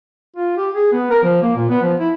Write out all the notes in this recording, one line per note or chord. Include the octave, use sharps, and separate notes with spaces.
F4
G4
G#4
B3
A#4
F3
A#3
A#2
B3
F3
E4